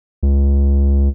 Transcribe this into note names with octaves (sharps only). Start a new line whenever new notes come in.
C#2